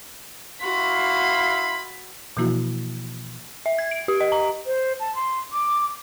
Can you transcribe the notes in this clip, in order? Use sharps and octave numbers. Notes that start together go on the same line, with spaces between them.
E4 F#4 F5 B5 C6
B2 E3 F3 A#3 E4 F#4
E5
G#6
D7
G4
D#5
A#5
C5
A5
C6
D6